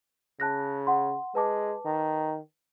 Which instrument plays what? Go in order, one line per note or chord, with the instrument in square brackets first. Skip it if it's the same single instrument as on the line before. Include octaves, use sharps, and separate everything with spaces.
[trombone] C#3 [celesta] A5 F#6 A#6
[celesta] F#5 C6
[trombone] G#3 [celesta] B4 A5 D6
[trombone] D#3